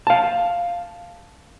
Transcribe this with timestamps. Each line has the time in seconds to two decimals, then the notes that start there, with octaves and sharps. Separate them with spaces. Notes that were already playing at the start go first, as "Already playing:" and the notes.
0.07 F5 A5